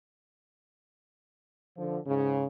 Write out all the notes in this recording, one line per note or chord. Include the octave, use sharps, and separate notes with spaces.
D3 F3
G#2 C#3